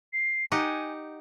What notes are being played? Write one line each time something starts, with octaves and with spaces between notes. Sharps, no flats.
C7
D#4 G4 F#5 G#5